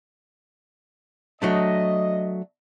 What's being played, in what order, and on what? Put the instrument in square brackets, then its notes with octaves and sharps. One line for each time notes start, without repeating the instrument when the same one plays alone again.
[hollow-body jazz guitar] F#3 A3 D4 [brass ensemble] D#5